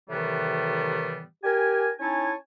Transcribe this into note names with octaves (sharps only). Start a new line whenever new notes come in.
A2 C3 D#3 E3 G3 B3
G4 A#4 G#5
C#4 D#4 E4 C#5 G#5 A5